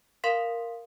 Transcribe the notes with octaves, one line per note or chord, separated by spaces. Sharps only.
A#4 F5 C6 B6